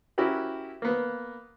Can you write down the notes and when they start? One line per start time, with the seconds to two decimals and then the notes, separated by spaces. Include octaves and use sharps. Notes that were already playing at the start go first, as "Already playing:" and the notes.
0.18 C#4 E4 F#4 G4 A#4
0.82 A#3 B3